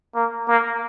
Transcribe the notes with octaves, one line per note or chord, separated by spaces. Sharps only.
A#3
A#3